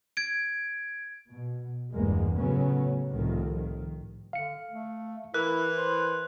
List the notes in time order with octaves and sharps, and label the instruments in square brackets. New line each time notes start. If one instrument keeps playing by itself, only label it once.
[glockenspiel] G#6 D7
[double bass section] B2
G1 E2 G2 G#3 A#3
A2 C#3 F#3 B3 C#4
C2 A2 D#3 F3
D#3
[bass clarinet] D3 [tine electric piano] F5 C#7
[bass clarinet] A3
[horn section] E3 [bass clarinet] E4 [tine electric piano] A#4 [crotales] F#6
[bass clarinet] C5